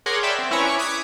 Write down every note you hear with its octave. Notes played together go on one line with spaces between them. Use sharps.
G#4 A#4 C#5 F#5 C6 D6
D5 E5 G5 A5 B5
C4
C#4 E4 B4 C#5 G#5 A#5
B5 C#6 D6
D6 D#6 F#6 G#6 B6 C#7